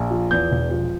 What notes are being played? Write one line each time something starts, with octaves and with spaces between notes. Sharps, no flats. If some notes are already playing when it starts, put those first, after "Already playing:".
Already playing: A#1
F3
E2 G6
E1
F3